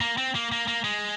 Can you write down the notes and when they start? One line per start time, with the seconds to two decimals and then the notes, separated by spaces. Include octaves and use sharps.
0.01 A#3
0.18 C4
0.35 A#3
0.52 A#3
0.68 A#3
0.84 G#3